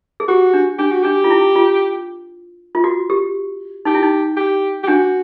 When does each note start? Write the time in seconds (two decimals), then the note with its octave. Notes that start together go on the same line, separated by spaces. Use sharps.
0.20 G#4
0.28 F#4 G4
0.54 D4
0.79 D4 G4
0.92 F#4
1.03 D4 G4
1.24 F4
1.30 E4
1.56 F4
2.75 F4
2.84 F#4
3.10 G4
3.85 D#4 G4
3.94 E4
4.03 D#4
4.37 G4
4.83 G4
4.88 D4 F#4